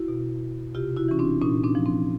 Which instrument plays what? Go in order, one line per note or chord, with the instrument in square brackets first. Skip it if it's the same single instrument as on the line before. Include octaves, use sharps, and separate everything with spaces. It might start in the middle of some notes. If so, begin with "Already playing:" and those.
Already playing: [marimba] E4 F#4
B2
C3 F4 G4
E4 F#4
E3 C#4
C4 D4
A#2 C#4 D#4
C4 D4
F3
C4